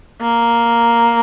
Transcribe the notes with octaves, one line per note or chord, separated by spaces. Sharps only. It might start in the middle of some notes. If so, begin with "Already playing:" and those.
A#3